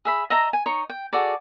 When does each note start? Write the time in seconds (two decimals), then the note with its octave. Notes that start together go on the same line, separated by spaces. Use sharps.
0.05 G#4 E5 B5
0.30 D#5 E5 A5 A#5
0.53 G#5
0.66 D#4 C#5 C#6
0.89 G5
1.13 F#4 G#4 A4 D5